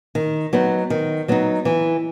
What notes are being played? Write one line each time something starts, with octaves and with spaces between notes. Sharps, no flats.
D#3
F#3 B3 D#4
D#3
F#3 B3 D#4
E3